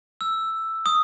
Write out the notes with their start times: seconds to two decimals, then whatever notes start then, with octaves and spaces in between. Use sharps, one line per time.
0.21 E6
0.86 D#6